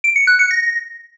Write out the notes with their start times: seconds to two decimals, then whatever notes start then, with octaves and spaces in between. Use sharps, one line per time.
0.04 D7
0.16 C#7
0.27 F#6
0.39 C#7
0.51 A#6